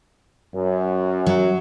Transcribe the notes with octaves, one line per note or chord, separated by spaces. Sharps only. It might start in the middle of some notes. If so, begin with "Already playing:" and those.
F#2
F#3